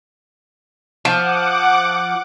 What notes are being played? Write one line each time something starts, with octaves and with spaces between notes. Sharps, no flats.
F3 F#5 D6